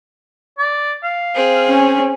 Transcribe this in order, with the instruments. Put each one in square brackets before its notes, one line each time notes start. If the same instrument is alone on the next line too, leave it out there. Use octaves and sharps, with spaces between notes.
[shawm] D5
F5
[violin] C4 G#4
[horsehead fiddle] C#4